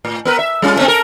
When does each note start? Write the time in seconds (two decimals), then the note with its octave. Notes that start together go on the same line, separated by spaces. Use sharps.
0.05 A2
0.25 B3 A#4 B4
0.39 E5
0.62 G3 C#4 F4
0.77 A3 B3 C4
0.88 A4 A#4